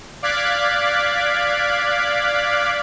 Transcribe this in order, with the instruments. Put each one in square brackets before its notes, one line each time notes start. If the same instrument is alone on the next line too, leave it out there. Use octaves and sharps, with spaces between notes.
[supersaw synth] D5 F5 D6 F#6 G#6 B6